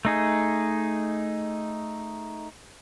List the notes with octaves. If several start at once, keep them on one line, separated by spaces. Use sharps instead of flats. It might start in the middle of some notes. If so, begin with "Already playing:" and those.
A3 D#4 G#4